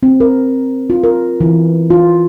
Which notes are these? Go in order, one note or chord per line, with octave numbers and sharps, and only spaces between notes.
C4
A#4
F4
A#4
E3
F4